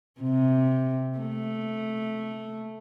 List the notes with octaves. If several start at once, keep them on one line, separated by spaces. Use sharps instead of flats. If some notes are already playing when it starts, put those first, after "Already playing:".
C3
A3